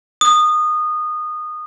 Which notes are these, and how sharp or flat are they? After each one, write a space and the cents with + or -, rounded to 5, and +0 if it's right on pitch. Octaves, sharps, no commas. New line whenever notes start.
D#6 -20